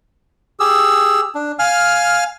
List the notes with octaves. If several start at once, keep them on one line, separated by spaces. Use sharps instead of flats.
G4 G#4 E6
D4
F5 G#5 F6